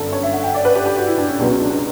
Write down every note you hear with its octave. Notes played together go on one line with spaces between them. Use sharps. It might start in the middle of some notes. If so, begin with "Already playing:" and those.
Already playing: G1 F#2 D3 A4
C#5
E5
F#5
G5
D5
B4
G4
G4
F#4
E4
D4
C#4
C#2 B2 F#3 B3 D4
C#4
D4
D4